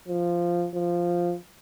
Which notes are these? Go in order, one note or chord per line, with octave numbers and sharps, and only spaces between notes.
F3
F3